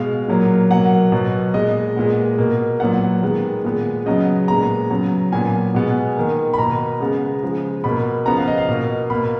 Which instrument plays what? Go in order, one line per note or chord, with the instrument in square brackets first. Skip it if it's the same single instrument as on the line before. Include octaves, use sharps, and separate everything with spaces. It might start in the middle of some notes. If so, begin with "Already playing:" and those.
Already playing: [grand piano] B2 G#3 B3 F5
A#2 F#3 A#3
B2 F#3 A#3 F#5
B2 F#3 B3
A#2 G#3 B3 D#5
A#2 G#3 B3
B2 A#3
A#2 F#3 B3 F#5
D#3 G#3 B3
A#2 G#3 B3
C#3 F#3 B3 D#5
A#2 G#3 B3 A#5
C#3 F#3 B3
A#2 F#3 B3 G#5
B2 G#3 B3
D#3 A#3
B5
B2 A#3 A#5
C#3 G#3 B3
C#3 F3 G#3
B2 A#3 B5
C#3 F3 B3 A#5
F5
D#5
F5
B2 A#3
B2 A#3 B5